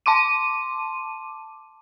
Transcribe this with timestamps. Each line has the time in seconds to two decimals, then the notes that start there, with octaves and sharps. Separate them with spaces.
0.06 A5 C6 D6 D#7